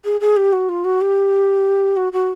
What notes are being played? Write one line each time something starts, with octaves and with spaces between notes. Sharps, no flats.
G#4
G#4
G4
F#4
F4
F#4
G4
F#4
F#4